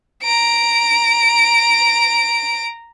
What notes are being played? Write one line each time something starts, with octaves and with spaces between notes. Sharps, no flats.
A#5 D7